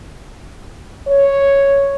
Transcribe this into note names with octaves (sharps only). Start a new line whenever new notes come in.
C#5